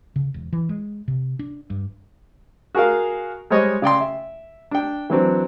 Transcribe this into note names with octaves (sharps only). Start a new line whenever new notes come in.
C#3
E1
E3
G#3
C3
D4
G2
F#4 G#4 A#4 F5
G3 G#3 C5 C#5 D#5
C#3 D5 G5 C6
E5
D4 G5
E3 F#3 C4 D4